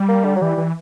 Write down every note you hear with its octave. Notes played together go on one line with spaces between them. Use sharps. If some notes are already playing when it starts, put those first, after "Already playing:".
Already playing: G3
A#3
D3
F#3
E3 G3
E3